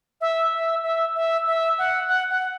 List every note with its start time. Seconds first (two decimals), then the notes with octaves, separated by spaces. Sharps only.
0.21 E5
0.53 E5
0.83 E5
1.15 E5
1.47 E5
1.78 F#5
2.09 F#5
2.30 F#5